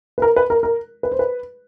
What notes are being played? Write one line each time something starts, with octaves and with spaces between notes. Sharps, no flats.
B4
A#4
B4
A#4
A#4
B4
C5
B4